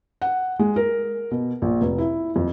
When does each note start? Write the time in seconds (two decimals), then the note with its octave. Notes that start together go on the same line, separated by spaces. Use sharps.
0.22 F#5
0.59 G#3
0.76 A#4
1.31 B2
1.62 A#1
1.81 F1
1.98 E4
2.36 F2